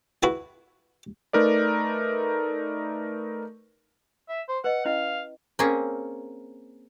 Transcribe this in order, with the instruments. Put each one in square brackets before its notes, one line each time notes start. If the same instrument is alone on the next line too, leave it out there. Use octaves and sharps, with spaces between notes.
[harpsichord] E4 F#4 B4 E5 A5
[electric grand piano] A3 D#4 A#4 B4 D5
[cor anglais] E5
C5
[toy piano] B4 D#5 [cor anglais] F#5
[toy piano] C#4 E4 D#5 [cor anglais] F5
[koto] A#3 C4 C#4 G#4